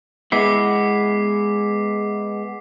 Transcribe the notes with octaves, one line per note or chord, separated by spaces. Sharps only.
G#3 B3 E4 D6 B6 C7